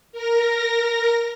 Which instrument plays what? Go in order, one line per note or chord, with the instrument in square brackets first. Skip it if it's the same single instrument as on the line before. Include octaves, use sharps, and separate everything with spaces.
[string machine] A#4 A#6